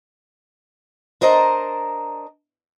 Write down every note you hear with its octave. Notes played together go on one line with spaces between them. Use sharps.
D4 A#4 C5 D#5 A5 A#5